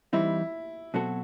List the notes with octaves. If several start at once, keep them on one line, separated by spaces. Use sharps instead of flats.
E3 G3 C4 D#4 E4
B2 F#3 C4 F#4 A4